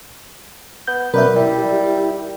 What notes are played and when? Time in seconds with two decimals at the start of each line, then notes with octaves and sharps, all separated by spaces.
0.87 B3 G6
1.14 B2 F#3 C#4 A#4 B4 D5 E5
1.36 G3 E4 G4